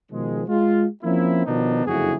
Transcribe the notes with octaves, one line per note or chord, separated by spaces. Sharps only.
B2 D#3 F3 G#3
G#3 F4
F3 A#3 C4 C#4 E4
B2 D#3 F3 B3 D4 D#4
F#1 F2 D3 E4 F#4 G#4